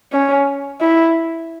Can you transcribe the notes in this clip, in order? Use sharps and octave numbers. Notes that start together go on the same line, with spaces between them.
C#4
E4